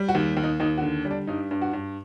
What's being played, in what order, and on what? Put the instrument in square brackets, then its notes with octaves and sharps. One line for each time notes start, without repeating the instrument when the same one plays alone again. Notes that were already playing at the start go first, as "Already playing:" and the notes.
Already playing: [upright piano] G3
F#4
D#2
D#2
D#4
D#2 D#4
F#4
D3
G3
D4
G2 D#4
G2
F#4
G2